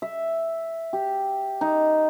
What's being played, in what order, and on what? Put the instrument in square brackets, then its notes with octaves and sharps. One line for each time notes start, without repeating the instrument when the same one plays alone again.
[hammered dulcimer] E5
G4
D#4